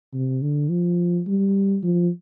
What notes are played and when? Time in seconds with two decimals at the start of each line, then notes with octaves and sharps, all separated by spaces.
0.13 C3
0.42 D3
0.70 F3
1.27 G3
1.83 F3